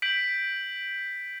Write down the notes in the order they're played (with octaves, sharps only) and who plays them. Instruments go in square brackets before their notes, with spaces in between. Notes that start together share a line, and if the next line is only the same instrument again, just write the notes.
[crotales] G6 B6 D7 F#7